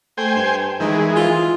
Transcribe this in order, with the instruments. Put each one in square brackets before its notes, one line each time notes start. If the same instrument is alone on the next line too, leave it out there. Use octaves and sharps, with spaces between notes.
[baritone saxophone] A3 [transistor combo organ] C5 G5 G#5
[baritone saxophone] G2
[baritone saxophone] D#3 [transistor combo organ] E3 G#3
[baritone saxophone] F4